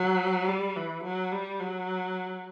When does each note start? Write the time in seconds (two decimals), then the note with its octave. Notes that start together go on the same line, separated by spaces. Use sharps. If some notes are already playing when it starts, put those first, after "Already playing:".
Already playing: F#3
0.48 G3
0.76 E3
1.04 F#3
1.32 G3
1.60 F#3